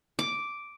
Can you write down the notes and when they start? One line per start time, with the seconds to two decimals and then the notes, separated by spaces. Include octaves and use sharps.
0.19 D6